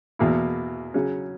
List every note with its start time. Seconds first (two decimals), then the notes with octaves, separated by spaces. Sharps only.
0.19 E2 B2 A#3 E4
0.94 C#3 F#3 C#4